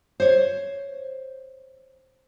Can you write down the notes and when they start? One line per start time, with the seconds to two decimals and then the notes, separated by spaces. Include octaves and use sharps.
0.20 C5 C#5